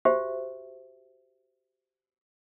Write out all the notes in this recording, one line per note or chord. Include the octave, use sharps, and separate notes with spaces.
F#4 G4 C5 E5